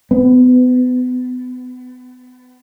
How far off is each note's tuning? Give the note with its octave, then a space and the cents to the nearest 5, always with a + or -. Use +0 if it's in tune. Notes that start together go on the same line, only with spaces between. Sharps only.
B3 +30